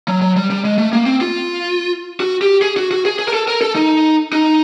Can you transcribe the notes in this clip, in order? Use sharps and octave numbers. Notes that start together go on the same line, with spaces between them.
F#3
F#3
G3
G3
G#3
A3
A#3
C4
F4
F#4
G4
G#4
F#4
F#4
G#4
G#4
A#4
A4
A#4
A4
D#4
D#4